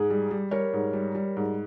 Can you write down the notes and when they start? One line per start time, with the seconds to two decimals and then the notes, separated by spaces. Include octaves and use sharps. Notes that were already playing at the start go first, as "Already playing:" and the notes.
Already playing: G#2 G#4
0.10 G3
0.31 G3
0.51 G3 A#4 C#5
0.73 G#2
0.93 G3
1.15 G3
1.36 G#2